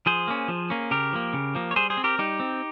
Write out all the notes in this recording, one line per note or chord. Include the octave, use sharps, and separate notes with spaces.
F3 G#4 C5
A#3 C#4
F3
A#3 C#4
C#3 G4 A#4
F3 A#3
C#3
F3 A#3
C#5
G3 G#4 C5
G#4 C5
C4
G4 A#4
G3 D#4 G4
C4